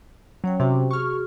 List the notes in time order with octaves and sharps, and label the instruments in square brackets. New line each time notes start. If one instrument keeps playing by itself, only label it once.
[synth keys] F#3 [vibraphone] C#4 C#5 G5
[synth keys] C3 [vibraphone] C#4 F#4 G5
[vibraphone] F#4 G#4 [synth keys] C#6 F6